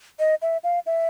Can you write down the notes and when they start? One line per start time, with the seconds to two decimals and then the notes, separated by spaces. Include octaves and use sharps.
0.19 D#5
0.42 E5
0.64 F5
0.86 E5